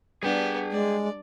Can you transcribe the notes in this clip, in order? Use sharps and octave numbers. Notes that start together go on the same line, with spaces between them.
G3 B3 D4 G#4 G5
G#3 D5